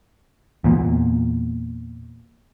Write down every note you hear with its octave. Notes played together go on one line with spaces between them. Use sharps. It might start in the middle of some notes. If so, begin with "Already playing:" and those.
E2 A#2